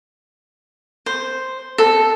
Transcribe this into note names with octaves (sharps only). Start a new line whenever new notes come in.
C5
A4